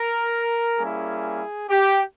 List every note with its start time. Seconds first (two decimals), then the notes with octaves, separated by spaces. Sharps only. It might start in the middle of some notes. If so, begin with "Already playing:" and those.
Already playing: A#4
0.78 G3 A#3 C#4 E4 G#4
1.70 G4